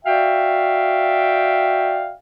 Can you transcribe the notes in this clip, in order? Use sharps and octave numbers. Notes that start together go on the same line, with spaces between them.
F#4 D5 E5 F5 G5